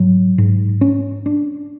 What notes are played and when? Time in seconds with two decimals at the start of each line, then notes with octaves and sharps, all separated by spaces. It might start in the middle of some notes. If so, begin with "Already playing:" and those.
Already playing: G#2 F#3
0.38 G#2
0.81 C#4
1.26 D4